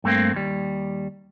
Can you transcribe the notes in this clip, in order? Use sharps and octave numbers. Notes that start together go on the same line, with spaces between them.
G2 A3 A#3 C4
D#2 G3